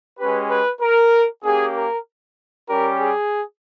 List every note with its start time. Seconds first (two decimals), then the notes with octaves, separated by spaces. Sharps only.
0.19 G#3 C#4 G4 B4
0.50 B4
0.82 A#4
1.44 A#3 C#4 G4 G#4
1.75 A#4
2.68 G3 C#4 G4 A#4
2.99 G#4